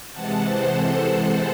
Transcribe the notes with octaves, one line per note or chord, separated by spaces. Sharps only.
C3 E3 G#3 F#5 A5
C5
A4
C5